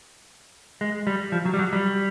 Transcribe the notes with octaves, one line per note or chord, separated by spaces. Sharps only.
G#3
G3
F3
F#3
G3
F#3
G3